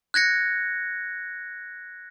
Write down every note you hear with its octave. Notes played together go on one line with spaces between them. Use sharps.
F#6 G#6 A#6 C#7